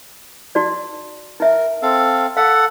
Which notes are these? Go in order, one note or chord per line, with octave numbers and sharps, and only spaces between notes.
D#4 F#4 D5
D#4 A#4 E5
C4 A4 F5
A4 F5 F#5